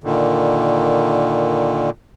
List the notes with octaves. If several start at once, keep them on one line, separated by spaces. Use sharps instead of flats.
A#2 D3 D#3